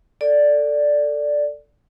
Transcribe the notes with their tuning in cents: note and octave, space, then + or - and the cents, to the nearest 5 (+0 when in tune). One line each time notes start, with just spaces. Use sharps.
A4 +15 D5 +0